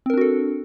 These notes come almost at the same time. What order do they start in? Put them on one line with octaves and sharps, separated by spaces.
C4 A#4 D4 F#4 A4